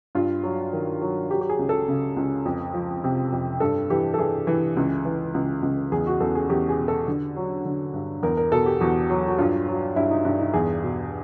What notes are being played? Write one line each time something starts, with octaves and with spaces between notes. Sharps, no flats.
G2 F4
F#3
D#3
F#3
F#3 G4
G4
G#4
C#2
A4
C#3
C#2
F2
F3
C3
F2
G2 A4
E3 G4
A4
E3 G#4
E3
C#2
E3
C#2
C#2
E2 G#4
F#4
E2 A4
G#4
E2 G4
G#4
B2
A4
D3
F#3
D3
G2
E2 A#4
A#4
B2 A4
G4
E2 F#4
F#3
F#4
G2 F4
F#3
G2 E4
D#4
G2 D4
D#4
E2 G#4
B2